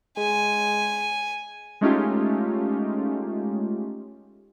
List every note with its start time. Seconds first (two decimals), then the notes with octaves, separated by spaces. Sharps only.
0.18 G#3 G#5
1.81 G#3 A3 C#4 D#4 F4 G4